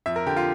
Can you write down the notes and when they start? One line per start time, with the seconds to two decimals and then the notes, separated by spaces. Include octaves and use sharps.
0.06 F2 E5
0.16 A#4
0.26 D3 G4
0.36 F4